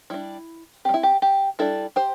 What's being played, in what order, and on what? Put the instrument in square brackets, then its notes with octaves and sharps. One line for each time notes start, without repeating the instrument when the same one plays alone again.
[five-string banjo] G3 D4 E4
G3 C4 G4
E4
G4
G4
G3 D4 E4 A4
G4 C5